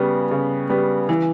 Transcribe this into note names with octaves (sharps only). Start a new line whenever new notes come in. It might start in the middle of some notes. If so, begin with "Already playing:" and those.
Already playing: C#3 G3 B3
C#3
G3 B3
E3